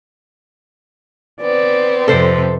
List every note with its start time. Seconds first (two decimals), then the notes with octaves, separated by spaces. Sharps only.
1.41 B3 C4 D5
2.08 F2 C3 A4 C5